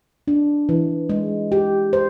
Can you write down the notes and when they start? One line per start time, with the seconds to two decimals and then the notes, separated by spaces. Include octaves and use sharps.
0.28 D4
0.69 E3
1.09 G#3
1.52 G4
1.93 C5